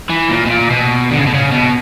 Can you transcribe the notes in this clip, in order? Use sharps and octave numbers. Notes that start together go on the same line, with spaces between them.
E3
A#2
B2
A#2
B2
D3
C#3
B2
C#3
B2